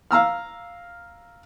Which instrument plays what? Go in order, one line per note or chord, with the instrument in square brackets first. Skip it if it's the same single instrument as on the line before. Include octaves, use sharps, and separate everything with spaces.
[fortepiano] F5 A#5 E6 F6